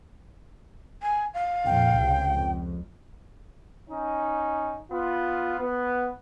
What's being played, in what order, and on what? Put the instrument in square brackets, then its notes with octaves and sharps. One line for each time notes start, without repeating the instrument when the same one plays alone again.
[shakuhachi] G#5
F5
[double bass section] F2 A#2 [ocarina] G5
[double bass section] C#2 C3
F2
[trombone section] C#4 D#4
B3 F4
B3